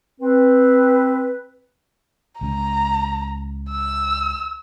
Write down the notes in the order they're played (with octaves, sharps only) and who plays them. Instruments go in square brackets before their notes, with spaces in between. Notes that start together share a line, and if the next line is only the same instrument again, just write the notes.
[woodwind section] C4 B4
[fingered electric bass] C#2 C#3 [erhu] A#5
[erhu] E6